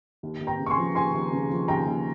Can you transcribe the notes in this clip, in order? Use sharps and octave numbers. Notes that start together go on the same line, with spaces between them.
D#2
D#2
G5 A#5
C#3
C#6
G#5 C6
F3
D#2 G#5 C6
D#2
C#3
F3
D#2 G5 A#5
D#2